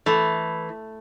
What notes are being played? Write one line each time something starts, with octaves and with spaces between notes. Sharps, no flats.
E3 A3